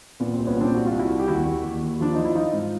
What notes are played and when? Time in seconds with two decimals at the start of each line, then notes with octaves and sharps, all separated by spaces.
0.20 A#2 B3
0.34 C4
0.38 C2
0.47 B3 C#4
0.56 A#2
0.61 C4 D4
0.74 C2 F#4
0.86 F4
0.92 C2
0.99 E4 F#4
1.10 C2
1.20 G4
1.27 D#2 E4 F#4
1.46 D#2
1.63 D#2
1.82 D#2
2.00 F3 D4
2.13 F3 D#4
2.25 E4
2.35 F3 D#4 F4
2.53 G#2